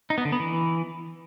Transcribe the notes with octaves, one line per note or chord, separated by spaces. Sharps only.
D#4
B3
D3
B3
E3